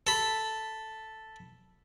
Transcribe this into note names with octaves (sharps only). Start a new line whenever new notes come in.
A4 B5